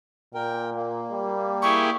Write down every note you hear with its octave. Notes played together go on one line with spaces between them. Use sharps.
A#2 A#4 G5
A#3
G3
E4 G4 G#4 C#6